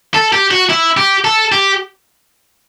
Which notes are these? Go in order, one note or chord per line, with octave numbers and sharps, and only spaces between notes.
A4
G4
F#4
E4
G4
A4
G4